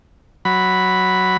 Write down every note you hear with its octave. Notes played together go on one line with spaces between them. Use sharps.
F#3 B5